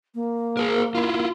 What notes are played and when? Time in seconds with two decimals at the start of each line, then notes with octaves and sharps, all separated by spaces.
0.15 A#3
0.57 G#4 A#4
0.95 E4 F4